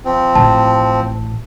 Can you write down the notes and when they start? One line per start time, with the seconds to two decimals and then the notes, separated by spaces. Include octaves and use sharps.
0.05 F3 C4
0.35 A1 A5